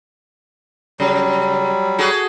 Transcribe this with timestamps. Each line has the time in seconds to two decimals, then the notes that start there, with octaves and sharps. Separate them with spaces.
1.00 C#3 F#3 G3
1.98 F#4 G#4 A4